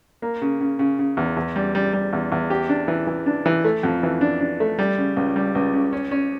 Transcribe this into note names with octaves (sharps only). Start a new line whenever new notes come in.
A#3
C#3
C#3
C#3
C#3
E2
E2
G3
G3
G3
E2
E2
G4
D4
E3
E3
D4
E3
A3
F2
E3
D4
D4
A3
G3
C#3
C#2
G3
C#2
C#3
C#4
C#4